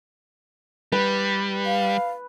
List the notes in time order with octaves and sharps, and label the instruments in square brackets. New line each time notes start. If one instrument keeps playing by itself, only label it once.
[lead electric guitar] G3 [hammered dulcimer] B4
[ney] F5